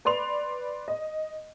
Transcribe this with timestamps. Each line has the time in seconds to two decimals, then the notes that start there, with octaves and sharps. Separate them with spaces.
0.05 B4 D5 B5 C6 F7
0.88 D#5